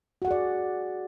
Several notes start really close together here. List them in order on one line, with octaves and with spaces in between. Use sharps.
F#4 F#5 G#4 D5